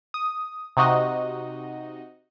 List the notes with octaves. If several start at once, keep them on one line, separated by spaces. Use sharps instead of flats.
D#6
C3 D#4 F#4 D#5